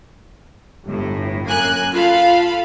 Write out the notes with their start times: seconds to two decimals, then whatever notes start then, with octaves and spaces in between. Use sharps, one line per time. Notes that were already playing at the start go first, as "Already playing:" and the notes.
0.86 G1 A2
1.45 F#2 A#3 G#5 F#6
1.92 F4 A4 F5 B5